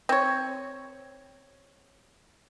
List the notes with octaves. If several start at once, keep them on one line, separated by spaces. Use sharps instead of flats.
C4 C#5